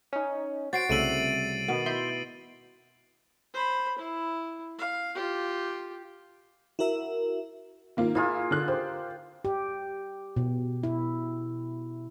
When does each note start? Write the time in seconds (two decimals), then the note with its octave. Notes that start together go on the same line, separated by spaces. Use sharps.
0.13 C#4 D#4
0.73 F#4 C5 A6 C7 D7
0.89 C2 C#3 A3 E5 D7 D#7 F#7
1.68 B2 D#3 B3
1.86 E4 E5 C6 G6
3.54 C5 B5
3.98 E4
4.78 F5
5.15 F4 G4
6.79 E4 F#4 A#4 E5
7.97 D#3 A#3 F4
8.15 A#3 E4 F4 G#4
8.51 D3 D4 F#6
8.68 G4 C5
9.45 G4
10.36 B2
10.83 E4